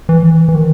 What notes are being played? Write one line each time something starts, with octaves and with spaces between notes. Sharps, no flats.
E3
E3
D#3